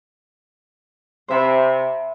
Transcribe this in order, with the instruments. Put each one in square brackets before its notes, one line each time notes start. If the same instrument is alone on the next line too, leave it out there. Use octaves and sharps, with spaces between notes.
[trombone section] C3 [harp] C5 E5 B5